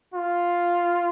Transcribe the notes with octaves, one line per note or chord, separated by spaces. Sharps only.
F4